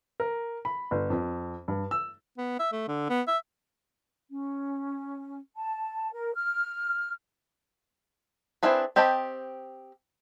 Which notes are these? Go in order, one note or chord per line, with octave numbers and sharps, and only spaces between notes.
A#4
B5
G1
F2
G2
E6
B3
E5
A3
D3
B3
E5
C#4
A5
A#4
F6
C4 D4 E4 G#4 B4
C4 G4 D#5 A5 B5